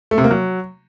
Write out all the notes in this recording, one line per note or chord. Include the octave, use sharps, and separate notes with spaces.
A3
C3
A#3
F#3